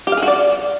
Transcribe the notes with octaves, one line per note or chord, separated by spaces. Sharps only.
G4
F5
G#4
F#4
D5